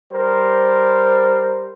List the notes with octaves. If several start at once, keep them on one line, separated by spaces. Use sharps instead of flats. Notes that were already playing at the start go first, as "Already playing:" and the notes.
G3 A#4 C5